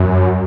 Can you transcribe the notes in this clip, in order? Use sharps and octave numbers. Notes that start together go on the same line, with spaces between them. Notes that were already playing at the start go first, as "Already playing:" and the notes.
Already playing: F#2